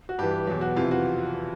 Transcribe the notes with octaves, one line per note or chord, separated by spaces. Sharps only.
F#4
G2 E3 G4
E2 B2 F#3 G4
F#4
F2 C3 E3 F4
F#4